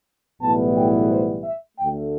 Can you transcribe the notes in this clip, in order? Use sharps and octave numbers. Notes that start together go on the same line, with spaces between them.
B1 A2 E3 G3 B3 A5
G5
C5
E5
D2 D3 A3 G5